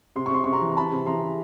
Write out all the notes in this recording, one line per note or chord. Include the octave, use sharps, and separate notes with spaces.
C3 C6
C#6
C3 C6
C3 C#6
A#5 C6
E3
A#5
C3 A5 B5
C3
E3 A#5 C6
C3